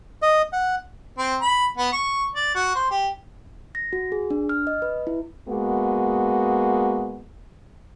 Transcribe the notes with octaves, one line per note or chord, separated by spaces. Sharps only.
D#5
F#5
C4
B5
B3
C#6
D5
F#4
C5
G4
A#6
F#4
G#4
D4
F6
D#5
B4
E4
G#3 A#3 B3 F#4